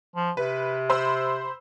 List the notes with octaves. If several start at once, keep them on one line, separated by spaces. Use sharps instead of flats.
F3
C3 B4
C5 B5 E6